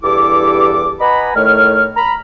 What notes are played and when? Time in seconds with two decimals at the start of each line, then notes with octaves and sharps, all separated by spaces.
0.03 E2 G2 E4 G4 A4 D6
1.01 B4 D#5 F#5 G#5 A#5 B5
1.36 A2 D#3 A3 C#5 F6
1.97 A#5 B5